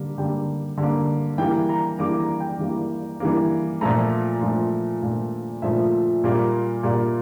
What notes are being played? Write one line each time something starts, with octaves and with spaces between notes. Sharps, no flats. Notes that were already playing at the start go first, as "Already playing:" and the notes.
Already playing: D3 G3 A#3
D3 G3 A#3 G5
D3 G3 A#3
E3 G3 A#3 G5
A#5
E3 G3 A#3 D6
A#5
G5
E3 G3 A#3
E3 G3 A#3
A#2 F3 A3 A#5
A#2 F3 A3
A#2 F3 A3
A#2 F3 A3 E5
A#2 G3 A#3
A#2 G3 A#3 D5